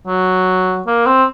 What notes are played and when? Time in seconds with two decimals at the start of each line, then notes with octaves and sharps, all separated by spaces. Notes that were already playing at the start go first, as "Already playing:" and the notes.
0.07 F#3
0.87 A#3
1.07 C4